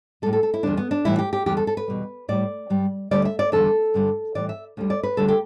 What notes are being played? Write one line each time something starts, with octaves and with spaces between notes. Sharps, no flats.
A2 G3 A4
A4
A4
E4
E2 D3 G3 D4
B3
D4
A2 E3 G3 E4
G4
G4
E2 D3 G3 G4
A4
A4
B4
E2 B2 G3
A2 G3 D5
G2 G3
D2 D3 G3 D5
E5
D5
E2 D3 G3 A4
G2 D3 G3
A2 E3 G3 D5
E5
D2 D3 G3
D5
B4
D2 D3 G3 A4
G4